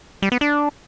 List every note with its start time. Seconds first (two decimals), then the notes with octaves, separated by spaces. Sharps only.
0.22 G3
0.32 B3
0.41 D4